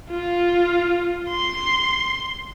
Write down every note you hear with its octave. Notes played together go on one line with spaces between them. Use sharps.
F4
C6